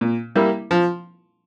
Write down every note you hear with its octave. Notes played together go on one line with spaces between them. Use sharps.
A#2
G3 A#3 E4
F3